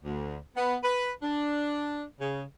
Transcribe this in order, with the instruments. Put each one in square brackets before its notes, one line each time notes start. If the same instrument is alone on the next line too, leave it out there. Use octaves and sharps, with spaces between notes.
[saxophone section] D2
B3
B4
D4
C#3